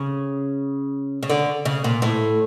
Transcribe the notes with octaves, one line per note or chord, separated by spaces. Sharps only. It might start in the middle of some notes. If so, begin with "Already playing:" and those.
Already playing: C#3
C#3
D3
C#3
A#2
A2